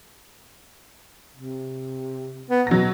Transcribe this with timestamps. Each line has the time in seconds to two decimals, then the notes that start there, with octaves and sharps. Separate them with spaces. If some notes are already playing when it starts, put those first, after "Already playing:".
1.36 C3
2.50 B3
2.67 B2 F#3 A#6